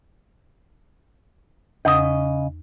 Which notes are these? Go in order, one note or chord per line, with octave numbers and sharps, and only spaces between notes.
E2 C#3 D#5 D#6